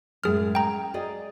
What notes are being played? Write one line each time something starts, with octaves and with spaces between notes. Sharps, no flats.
F#2 A2 G#3 G#4 F6
G5 A#5
G#4 D5 D#5